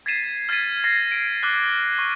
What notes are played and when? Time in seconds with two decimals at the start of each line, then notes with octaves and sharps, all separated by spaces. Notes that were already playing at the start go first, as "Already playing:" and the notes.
0.06 G#6 A6 B6 C7 D#7 E7
0.49 F6 G#6 A6 B6 D#7
0.84 A6 A#6 C7
1.12 C7 D7
1.43 D6 F6 F#6
1.98 C#6